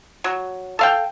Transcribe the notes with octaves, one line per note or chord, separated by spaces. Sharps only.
F#3
A4 F5 G5